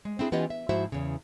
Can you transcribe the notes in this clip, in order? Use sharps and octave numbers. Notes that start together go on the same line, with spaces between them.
G#3
C4 D4 E4 G#4
E3 B3 C#4 F4 G4 D#5
E5
G#2 F3 E4 F#4 C5 E5
E2 C#3